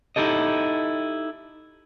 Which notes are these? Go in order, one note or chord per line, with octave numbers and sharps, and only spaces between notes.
D#4 E4 G4 A4 D#5